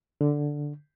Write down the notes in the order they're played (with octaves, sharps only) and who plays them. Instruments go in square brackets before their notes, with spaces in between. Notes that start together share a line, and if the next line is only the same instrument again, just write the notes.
[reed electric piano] D3